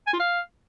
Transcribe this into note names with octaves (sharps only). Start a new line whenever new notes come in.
G#5
F4
F5